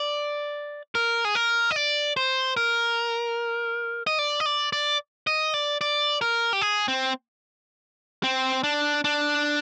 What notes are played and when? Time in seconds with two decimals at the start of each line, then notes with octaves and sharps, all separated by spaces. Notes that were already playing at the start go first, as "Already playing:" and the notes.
Already playing: D5
0.95 A#4
1.25 G#4
1.35 A#4
1.71 D#5
1.76 D5
2.17 C5
2.57 A#4
4.07 D#5
4.19 D5
4.40 D#5
4.46 D5
4.73 D5
5.27 D#5
5.54 D5
5.81 D5
6.21 A#4
6.53 G4
6.61 G#4
6.88 C4
8.23 C4
8.64 D4
9.04 D4